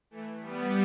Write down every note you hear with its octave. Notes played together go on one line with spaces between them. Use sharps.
E3 A3
G3 B3